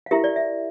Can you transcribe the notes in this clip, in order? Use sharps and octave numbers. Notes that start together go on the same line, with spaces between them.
F5
E4 G4 A#4 E5
D5
E5